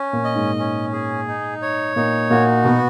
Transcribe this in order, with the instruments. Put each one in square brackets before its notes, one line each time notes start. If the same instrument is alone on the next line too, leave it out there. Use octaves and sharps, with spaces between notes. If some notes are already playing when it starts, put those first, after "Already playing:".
Already playing: [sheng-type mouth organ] C#4
[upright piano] A#2
[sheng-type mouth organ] D#5
[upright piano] G#2
[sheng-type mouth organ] C#4
G#4
D#4
C#5
[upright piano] A#2 [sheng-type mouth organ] D#4
[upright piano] A#2 [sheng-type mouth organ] F#4
[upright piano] B2 [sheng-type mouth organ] B3